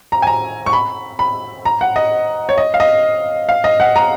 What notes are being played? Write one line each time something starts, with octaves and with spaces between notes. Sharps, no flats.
A#5
G#5
A#5
C#6
B5
B5
A#5
F#5
D#5
C#5
D#5
F5
D#5
F5
D#5
F#5
A#5